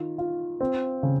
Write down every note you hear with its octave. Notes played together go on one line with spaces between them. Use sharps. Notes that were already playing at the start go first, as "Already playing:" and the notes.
Already playing: D#3 F4
F4
C4
C#3